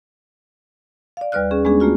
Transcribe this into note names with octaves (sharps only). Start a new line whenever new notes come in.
D5 F5
D#2 G3 B4 D5 F6 F#6
C#4 G#4
G#3 B3 C#4 D4 G#4
A3 A#3 F4 F#4